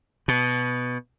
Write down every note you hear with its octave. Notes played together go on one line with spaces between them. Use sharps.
B2